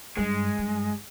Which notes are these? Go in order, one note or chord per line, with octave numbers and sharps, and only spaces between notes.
G2 G#3
G2